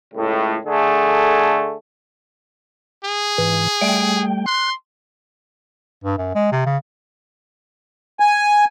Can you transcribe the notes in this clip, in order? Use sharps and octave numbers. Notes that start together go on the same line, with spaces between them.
C#2 A2
D3 A3 G#4
G#4
G#2 E3
G3 A3 G5
C6 F#6
G2
F#2
G#3
C3
C#3
G#5